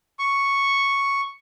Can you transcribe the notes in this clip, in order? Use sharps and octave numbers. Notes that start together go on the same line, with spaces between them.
C#6